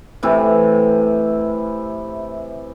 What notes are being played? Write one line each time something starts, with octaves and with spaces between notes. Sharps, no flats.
A2 C3 E3 E4